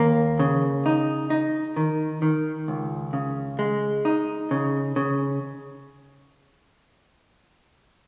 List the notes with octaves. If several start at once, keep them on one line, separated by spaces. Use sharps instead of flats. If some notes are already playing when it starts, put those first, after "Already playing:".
Already playing: D#2 A#3
C#3
D#4
D#4
D#3
D#3
C#2
C#3
G#3
D#4
C#3
C#3